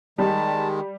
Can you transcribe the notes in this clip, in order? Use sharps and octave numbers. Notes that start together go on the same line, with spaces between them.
D#3 G3 G#3 A5